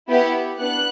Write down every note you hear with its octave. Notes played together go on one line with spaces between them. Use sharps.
B3 E4 G4
B3 D4 F#6